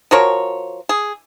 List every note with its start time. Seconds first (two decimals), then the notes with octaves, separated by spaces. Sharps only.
0.11 F3 F#4 A#4 C#5
0.89 G#4